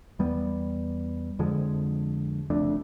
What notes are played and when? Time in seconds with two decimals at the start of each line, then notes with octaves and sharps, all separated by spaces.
0.19 E2 G3 B3
1.39 F2 D3 F3 G#3
2.50 F#1 F2 A3 D4